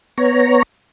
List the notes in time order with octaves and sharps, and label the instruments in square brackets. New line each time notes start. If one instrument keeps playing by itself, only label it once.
[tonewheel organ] B3 C#5 A#5